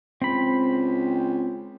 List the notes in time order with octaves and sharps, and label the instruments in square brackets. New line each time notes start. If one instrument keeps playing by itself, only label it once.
[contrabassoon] C#2 [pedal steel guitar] C4 B5